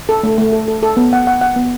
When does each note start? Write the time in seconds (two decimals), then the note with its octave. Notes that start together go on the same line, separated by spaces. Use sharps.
0.09 A4
0.23 A3
0.38 A3
0.53 A4
0.68 A4
0.83 A4
0.97 B3
1.13 F#5
1.27 F#5
1.41 F#5
1.56 B3